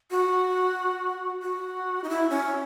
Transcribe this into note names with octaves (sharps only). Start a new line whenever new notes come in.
F#4
F#4
D#4
E4
C#4